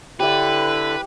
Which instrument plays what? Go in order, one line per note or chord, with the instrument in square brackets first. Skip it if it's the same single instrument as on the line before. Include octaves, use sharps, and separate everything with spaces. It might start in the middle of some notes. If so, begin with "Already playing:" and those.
[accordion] D3 [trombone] E4 [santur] G4 C#5 E5 [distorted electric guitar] B4